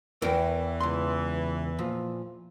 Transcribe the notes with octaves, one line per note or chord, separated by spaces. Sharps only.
E2 E3 A#4 G5
C#2 C6
A#2 F3